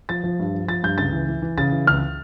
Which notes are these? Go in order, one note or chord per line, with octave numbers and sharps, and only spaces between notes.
F3 A6
F3
G2
F3
F3 A6
G2 G6
C#2 A6
E3
E3
E3
C#3 A6
E3
C#2 F6